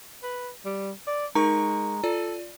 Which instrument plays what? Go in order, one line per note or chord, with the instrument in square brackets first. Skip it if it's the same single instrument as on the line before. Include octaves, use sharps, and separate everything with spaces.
[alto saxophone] B4
G3
D5
[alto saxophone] G#3 [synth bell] D#4 A#4 C#6 [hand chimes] A#5
[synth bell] F4 D5 [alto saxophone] A4